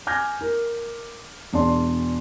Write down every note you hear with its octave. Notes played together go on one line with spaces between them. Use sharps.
G#5 D6 F6 G6 G#6 A#6
A#4
E1 E2 D4 D5 A5 C6